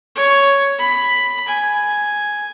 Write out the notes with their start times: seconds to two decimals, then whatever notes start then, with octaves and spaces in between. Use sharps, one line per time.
0.15 C#5
0.79 B5
1.47 G#5